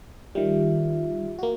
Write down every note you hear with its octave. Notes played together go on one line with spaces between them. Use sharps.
D#3 G3 F4 G4 E5
A#3 F#4